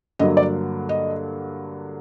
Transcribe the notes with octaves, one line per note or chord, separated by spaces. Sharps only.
G2 D3 F#3 A#3 D#5
D5
D#5